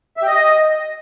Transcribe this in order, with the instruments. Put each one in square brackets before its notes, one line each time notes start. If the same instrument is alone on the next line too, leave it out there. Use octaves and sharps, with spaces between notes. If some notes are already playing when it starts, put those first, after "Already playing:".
[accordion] E5
G4
D#5